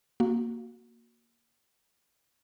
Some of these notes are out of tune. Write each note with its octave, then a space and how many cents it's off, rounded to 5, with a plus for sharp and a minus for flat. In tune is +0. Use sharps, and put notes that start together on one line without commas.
A#3 +0 F#4 -10